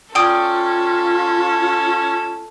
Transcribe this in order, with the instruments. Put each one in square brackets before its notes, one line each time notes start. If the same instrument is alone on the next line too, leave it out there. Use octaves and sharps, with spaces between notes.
[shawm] C#4 [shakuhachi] F4 [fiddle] A4 [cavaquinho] D5 G5 D#6